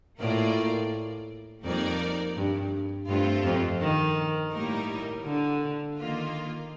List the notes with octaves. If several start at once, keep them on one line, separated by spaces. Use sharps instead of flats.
A2 A#3 F4 A#4 D5
F2 G3 A#3 D#4 A#4 D5
G2
G2 A3 C4 F4 A4
F2
D#3
A2 G3 A#3 D#4 A#4
D3
D#3 A#3 F4